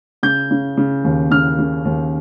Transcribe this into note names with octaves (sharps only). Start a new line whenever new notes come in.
C#3 G6
C#3
C#3
D#2
C#3 F6
C#3
D#2